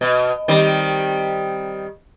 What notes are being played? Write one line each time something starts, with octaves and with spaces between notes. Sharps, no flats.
B2
D#3 G3 C4